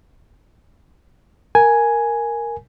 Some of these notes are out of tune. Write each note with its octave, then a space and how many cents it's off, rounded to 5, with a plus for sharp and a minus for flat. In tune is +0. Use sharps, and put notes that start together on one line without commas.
A#4 +0 G#5 +5